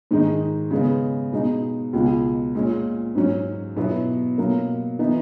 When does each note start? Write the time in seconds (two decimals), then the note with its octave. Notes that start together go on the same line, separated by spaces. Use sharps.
0.11 G#2 D#3 G#3 D#4
0.71 C#3 G#3 B3
1.33 B2 G#3 D#4
1.93 C#2 B2 G#3
2.55 A#2 G#3 C#4
3.15 G#2 F#3 C#4
3.76 B2 F#3 B3 E4
4.38 B2 F#3 A#3
4.99 E3 B3 D#4